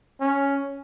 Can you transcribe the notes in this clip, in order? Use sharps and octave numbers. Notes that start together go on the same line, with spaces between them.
C#4